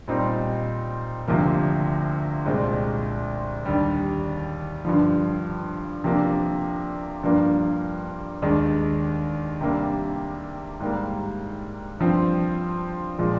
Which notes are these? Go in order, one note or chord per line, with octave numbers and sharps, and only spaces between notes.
A#2 G3 C4 D#4
D2 C3 F3 A#3
C2 A#2 G#3 C4
D#2 D3 G3
G2 D3 F3
C3 F3 A#3 D4
G2 F3 A#3 D4
D#2 D#3 G#3 D4
C3 G3 A#3 D4
G#2 G3 A#3
G2 F3 C4
A#2 F3 G#3